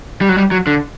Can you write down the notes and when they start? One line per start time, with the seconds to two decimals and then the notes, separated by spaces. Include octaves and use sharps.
0.21 G3
0.29 F#3
0.37 G3
0.51 F#3
0.67 D3